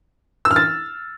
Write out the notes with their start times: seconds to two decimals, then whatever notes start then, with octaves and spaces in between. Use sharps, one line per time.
0.45 E6
0.51 F6
0.56 A6